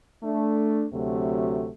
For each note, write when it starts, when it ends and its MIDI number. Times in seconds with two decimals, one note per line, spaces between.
0.23 0.86 57
0.23 0.86 62
0.93 1.70 38
0.93 1.70 48
0.93 1.70 54
0.93 1.70 57